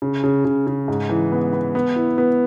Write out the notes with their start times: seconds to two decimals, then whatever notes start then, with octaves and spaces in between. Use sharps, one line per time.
0.02 C#3
0.24 C#3
0.45 C#3
0.67 C#3
0.88 G#2
1.09 E3
1.32 B3
1.53 B3
1.75 B3
1.96 E4
2.18 B3